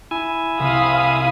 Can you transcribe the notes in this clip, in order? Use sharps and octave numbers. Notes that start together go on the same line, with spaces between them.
E4 G#5
C2 F5 B5 D#6